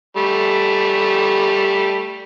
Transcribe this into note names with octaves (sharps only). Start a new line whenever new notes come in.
G3 A3